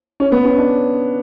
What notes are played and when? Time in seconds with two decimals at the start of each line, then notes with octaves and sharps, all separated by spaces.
0.20 C#4
0.32 B3
0.45 C#4
0.58 D4